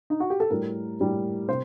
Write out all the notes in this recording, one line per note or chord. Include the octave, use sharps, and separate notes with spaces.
D#4
F#4
G4
A4
A2 G3 A#4
A2 G3
C3 C5